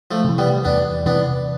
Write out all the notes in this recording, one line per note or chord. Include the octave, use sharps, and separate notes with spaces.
F3 A3
C3 E3
G3 B3
E2 B3 D4
C3 E3 B3 D4